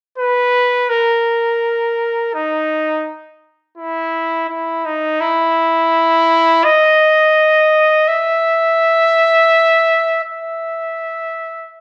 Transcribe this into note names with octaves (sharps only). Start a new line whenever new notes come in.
B4
A#4
D#4
E4
E4
D#4
E4
D#5
E5
E5